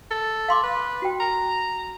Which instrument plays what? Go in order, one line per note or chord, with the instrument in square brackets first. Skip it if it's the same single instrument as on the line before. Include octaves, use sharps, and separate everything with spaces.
[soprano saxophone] A4
[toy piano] F5 C6 D6
[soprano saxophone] B4
[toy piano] F#4 G5
[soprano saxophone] A#5